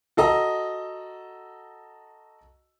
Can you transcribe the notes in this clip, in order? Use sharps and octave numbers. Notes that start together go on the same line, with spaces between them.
F#4 A4 D#5 A#5